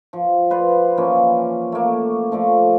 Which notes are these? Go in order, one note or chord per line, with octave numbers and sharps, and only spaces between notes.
F3
F4 B4 C5 D5
E3 F3 A#3 C#4
A3 A#3
F3 A3 D5